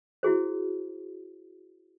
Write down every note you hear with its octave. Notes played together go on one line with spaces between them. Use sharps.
E4 F#4 G#4 C5